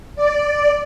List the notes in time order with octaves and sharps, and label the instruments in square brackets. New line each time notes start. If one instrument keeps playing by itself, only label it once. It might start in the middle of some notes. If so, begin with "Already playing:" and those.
[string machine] D5